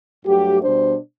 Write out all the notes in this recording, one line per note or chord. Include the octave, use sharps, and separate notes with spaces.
G2 F#3 A3 G4
B2 G3 D4 C5